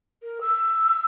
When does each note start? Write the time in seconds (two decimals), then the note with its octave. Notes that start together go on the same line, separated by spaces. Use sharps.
0.23 A#4
0.41 E6